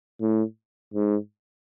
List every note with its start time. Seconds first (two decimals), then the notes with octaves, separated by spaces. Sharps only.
0.21 A2
0.94 G#2